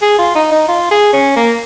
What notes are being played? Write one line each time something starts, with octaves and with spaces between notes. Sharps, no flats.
G#4
F4
D#4
D#4
F4
G#4
C#4
A#3